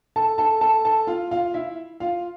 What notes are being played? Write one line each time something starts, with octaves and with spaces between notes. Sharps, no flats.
A4 A5
A4 A5
A4 A5
A4 A5
F4 F5
F4 F5
E4 E5
F4 F5